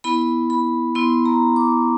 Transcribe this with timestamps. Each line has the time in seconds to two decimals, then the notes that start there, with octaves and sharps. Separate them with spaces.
0.04 B3 E4 B5
0.50 B5
0.95 B3 E4 C6
1.25 A#5
1.56 D6